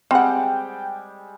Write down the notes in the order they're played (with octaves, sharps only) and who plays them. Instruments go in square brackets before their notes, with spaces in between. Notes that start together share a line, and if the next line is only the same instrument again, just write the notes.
[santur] G3 G#3 [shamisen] C4 F#5 [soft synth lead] G5